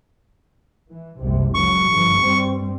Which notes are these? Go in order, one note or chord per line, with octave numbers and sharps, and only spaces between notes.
E3
F#1 C2 C3
C#2 F#3 C#6
G2 D3 F3
G2 G3 C4